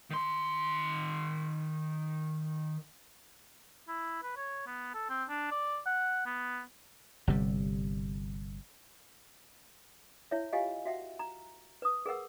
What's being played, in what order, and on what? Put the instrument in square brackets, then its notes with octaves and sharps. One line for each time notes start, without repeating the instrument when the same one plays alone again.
[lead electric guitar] D#3 C6
[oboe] E4
B4
C#5
B3
A4
C4
D4
D5
F#5
B3
[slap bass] G1 C3 G3
[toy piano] E4 C#5 E5
F4 G4 D#5 F5 G#5
F#4 E5 F#5
A#5
B4 D#6
G#4 A#4 B4 F#5 E6